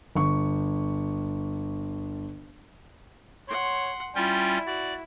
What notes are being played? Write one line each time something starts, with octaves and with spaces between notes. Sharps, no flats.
G1 C#6
C#5 F#5 C6
G3 C#4 E4 F4 G5
F#4 D5